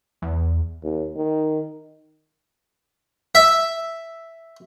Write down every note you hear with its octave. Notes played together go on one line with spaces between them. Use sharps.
E2
D#2
D#3
E5